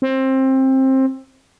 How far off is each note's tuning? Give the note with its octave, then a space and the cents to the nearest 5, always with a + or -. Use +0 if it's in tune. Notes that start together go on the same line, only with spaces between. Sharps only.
C4 +20